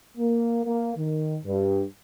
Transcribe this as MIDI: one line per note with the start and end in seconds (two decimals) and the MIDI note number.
0.18 0.64 58
0.65 0.92 58
0.96 1.36 51
1.45 1.83 43